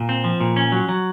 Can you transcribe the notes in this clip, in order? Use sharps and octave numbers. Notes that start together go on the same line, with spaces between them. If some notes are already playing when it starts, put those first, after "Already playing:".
Already playing: A#2
C4
F3
A#2
C#4
F#3
F#3